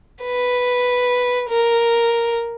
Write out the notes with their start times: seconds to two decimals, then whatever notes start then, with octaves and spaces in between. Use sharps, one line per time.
0.23 B4
1.49 A#4